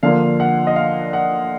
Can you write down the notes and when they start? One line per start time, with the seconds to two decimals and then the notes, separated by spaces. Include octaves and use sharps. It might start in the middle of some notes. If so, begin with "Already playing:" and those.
0.03 D3 F3 A#3 D4 F5
0.40 F#5
0.67 D#5
0.76 F5
1.13 F#5